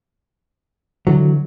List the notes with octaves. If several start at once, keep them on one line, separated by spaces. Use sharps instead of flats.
D3 E3 F#3